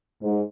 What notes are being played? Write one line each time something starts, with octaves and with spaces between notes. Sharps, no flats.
G#2